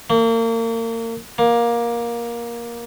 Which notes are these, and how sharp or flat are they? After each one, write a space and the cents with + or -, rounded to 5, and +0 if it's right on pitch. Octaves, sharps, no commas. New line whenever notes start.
A#3 -35
A#3 +15